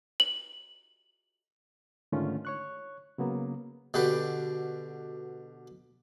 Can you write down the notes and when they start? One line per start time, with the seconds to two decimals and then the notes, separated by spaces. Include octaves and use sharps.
0.20 F#7
2.12 G#2 D3 D#3 A3 C#4 F4
2.45 C#5 C#6 F#6
3.18 C#3 F#3 A#3 B3
3.94 B2 D3 G4 B4